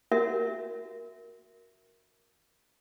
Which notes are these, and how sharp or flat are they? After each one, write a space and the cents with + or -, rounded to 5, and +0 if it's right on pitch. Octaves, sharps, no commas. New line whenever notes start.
F#4 +0 A#4 +0 E5 +0